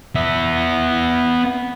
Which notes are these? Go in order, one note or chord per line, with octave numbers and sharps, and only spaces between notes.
B3 E5